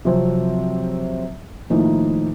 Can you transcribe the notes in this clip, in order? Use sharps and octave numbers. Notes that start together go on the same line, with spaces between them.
C3 F3 F#3 C4
A2 D#3 F3 A#3 D#4 E4